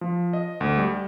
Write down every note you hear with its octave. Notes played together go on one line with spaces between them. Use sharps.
F3
D#5
D2
G3